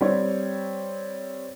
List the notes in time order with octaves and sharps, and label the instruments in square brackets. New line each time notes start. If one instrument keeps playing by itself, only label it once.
[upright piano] G3 C4 C#5